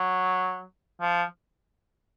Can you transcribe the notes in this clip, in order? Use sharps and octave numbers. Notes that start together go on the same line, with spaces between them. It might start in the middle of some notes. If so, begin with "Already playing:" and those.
Already playing: F#3
F3